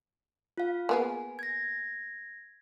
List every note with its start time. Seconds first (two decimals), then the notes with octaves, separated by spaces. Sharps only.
0.57 F4 F5
0.89 A#3 B3 G#4 G#5
1.39 G#6 A#6